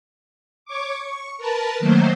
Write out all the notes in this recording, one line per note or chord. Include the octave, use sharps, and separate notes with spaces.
C#5 C#6 D6
C#6
A#4 B4 A5
D#3 F#3 A3 A#3 C5